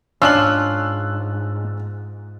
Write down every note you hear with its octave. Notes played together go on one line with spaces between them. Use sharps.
G#2 C#4 D4 F4 E6 F#6 F#7